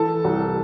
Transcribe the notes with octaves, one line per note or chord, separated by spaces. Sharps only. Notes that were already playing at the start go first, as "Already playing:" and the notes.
Already playing: E3 A4 A5
C2